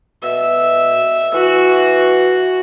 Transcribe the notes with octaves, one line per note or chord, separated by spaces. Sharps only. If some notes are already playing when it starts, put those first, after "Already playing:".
B2 E5
E3 F#4